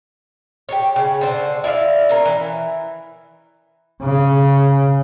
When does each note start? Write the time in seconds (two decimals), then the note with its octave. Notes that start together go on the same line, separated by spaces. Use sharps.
0.69 G4 A4 C#5
0.96 C#3
1.21 D3 C5 A5
1.64 E4 D5 D#5 F5
2.09 C#4 A#4
2.25 E3
4.03 C#3